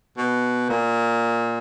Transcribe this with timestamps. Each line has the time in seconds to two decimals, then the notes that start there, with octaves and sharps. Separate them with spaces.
0.17 B2
0.69 A#2